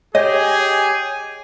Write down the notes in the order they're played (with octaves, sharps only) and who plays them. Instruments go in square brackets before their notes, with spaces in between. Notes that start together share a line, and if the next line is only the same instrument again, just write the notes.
[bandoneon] G4 G#5 [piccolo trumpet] G#4 [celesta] C#5 [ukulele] D#5